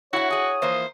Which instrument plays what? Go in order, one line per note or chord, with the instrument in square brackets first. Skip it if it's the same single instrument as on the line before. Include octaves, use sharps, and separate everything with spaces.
[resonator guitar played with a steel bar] E4 F#5 [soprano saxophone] F#4 [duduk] C#5
[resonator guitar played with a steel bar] G#4 F#5 [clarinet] D#6
[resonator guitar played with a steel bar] E3 F3 A#3 [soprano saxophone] C5